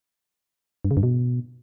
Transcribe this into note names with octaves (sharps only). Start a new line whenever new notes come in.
G2
C#3
G2
B2